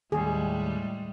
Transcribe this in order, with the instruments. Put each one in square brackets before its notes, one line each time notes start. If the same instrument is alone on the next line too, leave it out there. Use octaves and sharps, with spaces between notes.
[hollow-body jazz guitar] D#2 [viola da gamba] A2 G3 G#3 [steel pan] G#4